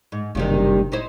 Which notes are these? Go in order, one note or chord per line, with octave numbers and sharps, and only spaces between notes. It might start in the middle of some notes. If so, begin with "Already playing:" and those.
G#2
F#1 G2 C3 D#3
D#4 E4 C5